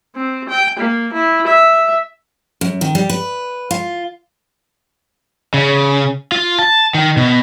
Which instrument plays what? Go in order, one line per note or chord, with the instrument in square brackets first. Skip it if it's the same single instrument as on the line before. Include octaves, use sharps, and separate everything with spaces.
[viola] C4
G5
A#3
E4
E5
[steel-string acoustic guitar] F#2
D#3
G3
B4
F4
[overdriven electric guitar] C#3
F4
A5
D#3
B2